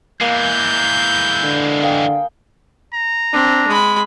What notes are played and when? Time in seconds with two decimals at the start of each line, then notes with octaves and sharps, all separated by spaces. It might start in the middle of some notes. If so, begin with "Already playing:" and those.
0.21 E3 G#3 A#3 G6
1.44 D3
1.82 G#4 F5 G5
2.93 A#5
3.33 C4 D4
3.68 G#3 B5